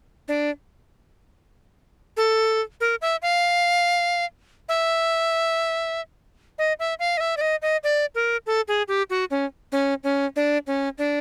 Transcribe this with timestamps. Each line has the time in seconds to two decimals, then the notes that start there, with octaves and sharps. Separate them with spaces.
0.28 D4
2.17 A4
2.81 A#4
3.02 E5
3.22 F5
4.69 E5
6.58 D#5
6.79 E5
6.99 F5
7.17 D#5
7.20 E5
7.37 D5
7.41 D#5
7.62 D#5
7.84 D5
8.15 A#4
8.46 A4
8.68 G#4
8.88 G4
9.10 F#4
9.31 C#4
9.72 C#4
10.04 C#4
10.36 D4
10.67 C#4
10.98 D4